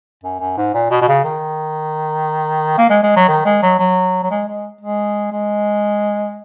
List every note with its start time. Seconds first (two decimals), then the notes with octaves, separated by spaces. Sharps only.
0.24 F#2
0.40 F#2
0.57 G#2
0.74 A#2
0.91 B2
1.01 B2
1.08 C#3
1.24 D#3
2.78 A#3
2.90 G#3
3.03 G#3
3.16 F#3
3.28 D#3
3.45 G#3
3.63 F#3
3.79 F#3
4.23 F#3
4.31 G#3
4.48 G#3
4.81 G#3
5.32 G#3